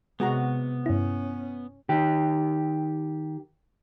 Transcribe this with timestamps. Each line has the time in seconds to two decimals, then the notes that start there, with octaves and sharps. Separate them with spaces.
0.20 C3 G#3 B3 F#4 A#5
0.86 G2 C#4 E4
1.89 D#3 G4